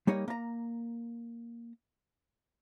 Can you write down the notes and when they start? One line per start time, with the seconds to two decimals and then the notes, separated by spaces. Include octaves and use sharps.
0.07 G3 A#3 D#4 C#5 D#5
0.28 A#3 A#5